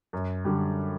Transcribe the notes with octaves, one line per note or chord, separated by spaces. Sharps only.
F#2
D3 G3